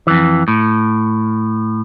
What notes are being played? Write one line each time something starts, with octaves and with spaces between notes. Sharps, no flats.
F2 E3
A2